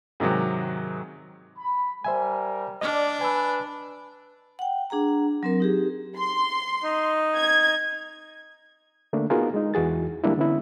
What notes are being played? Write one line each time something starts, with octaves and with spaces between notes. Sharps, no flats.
G#2 C3 D#3 F#3
B5
G3 A#4 C5 E5 G#5
D4 D5 D#5 F6
B4 G#5 E6
F#5 G5
D4 G#4 F#5 A#5
F#3 C4 A#4
D#4 G4 G#4
C6
D#4
G#6
D3 A3 A#3 D4
B3 D#4 F4 F#4 G#4 A#4
G#3 D#4
E2 E3 F#4 G#4 A6
D3 G3 G#3 A#3 D4 E4
D3 B3 C#4 E4